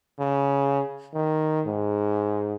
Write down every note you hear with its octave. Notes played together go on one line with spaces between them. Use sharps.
C#3
D#3
G#2